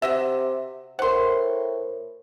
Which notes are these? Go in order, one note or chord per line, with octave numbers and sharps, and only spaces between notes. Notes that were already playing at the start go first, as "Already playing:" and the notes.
C3 F#4 D#5 E5
A2 A#4 C5 F#5 C6